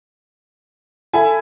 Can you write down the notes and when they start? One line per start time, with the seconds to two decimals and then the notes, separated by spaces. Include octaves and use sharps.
1.13 E4 A4 G#5 B5